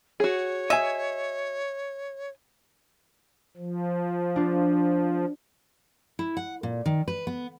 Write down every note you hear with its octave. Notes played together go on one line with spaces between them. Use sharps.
F#4 G#4 C#5
D#5 E5 G#5
F3
D4 F4
E4
F#5
A#2
D#3
B4
B3